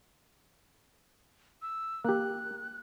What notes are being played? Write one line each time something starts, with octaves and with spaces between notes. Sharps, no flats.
E6
A#3 G4 F#6